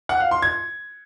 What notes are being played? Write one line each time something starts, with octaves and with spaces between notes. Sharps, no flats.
F#5
F5
C6
G#6